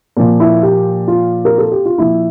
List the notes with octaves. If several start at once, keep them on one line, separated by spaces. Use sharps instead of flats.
A#2 F3
E4
G4
F4
A#4
A4
G4
F4
A#2 F3 E4